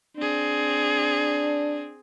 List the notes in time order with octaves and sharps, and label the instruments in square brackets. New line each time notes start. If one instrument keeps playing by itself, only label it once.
[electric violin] C4 G#4 [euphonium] D4